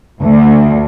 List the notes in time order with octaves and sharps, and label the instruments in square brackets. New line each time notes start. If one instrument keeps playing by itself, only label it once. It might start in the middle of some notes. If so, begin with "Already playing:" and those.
[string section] D2